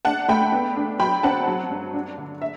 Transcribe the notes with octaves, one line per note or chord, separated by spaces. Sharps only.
D4 F#5 A5
A3 G5 B5
B3
D4
F#3 G5 B5
C4 F#5 A5
F#3
G2
D4
D3
E5